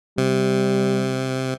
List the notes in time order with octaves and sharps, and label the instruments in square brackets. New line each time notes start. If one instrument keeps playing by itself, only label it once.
[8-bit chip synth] C3 [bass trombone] G3